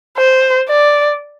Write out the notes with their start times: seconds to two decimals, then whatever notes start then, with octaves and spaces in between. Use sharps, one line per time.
0.18 C5
0.69 D5